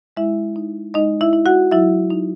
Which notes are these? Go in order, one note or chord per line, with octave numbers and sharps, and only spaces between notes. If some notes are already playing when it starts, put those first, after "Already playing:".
G#3 E4 E5
D#4
G#3 D#4 D#5
E4 E5
E4
F#4 F#5
F#3 E4 E5
D#4